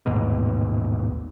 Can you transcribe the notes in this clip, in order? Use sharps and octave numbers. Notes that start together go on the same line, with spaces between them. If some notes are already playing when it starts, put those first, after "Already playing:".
A1 D#2 G#2 B2